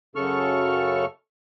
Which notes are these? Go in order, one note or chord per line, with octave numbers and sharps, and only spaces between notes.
F#2 C#3 A4 C#6 F6